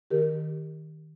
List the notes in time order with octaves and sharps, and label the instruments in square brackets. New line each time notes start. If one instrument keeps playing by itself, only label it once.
[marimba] D#3 G4 A#4